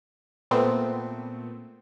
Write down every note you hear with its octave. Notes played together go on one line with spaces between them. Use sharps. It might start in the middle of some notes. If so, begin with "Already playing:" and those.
A#2 A3 B3 C4